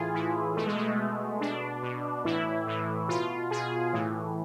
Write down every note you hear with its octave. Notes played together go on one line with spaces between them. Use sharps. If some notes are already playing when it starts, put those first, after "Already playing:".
Already playing: A2 E3 F4 G#4
A2 E3 E4
B2 A3
G#3
A3
B2
B2 D4
B2
A2 E3 E4
A2 E3
B2 F4
B2 G#4
A2 E3